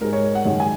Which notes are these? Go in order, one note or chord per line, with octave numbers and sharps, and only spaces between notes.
G#2 G#3 A#4
C#5
F#5
F#2 D#3 G#3
G#5